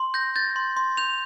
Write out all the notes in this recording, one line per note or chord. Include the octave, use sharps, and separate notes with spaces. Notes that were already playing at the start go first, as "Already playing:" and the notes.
Already playing: C6
G6 A#6
G6 A6
C6
C6
G6 F7